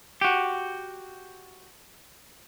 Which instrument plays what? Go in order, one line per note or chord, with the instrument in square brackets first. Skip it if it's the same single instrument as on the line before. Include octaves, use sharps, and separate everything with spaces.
[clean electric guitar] F#4 G4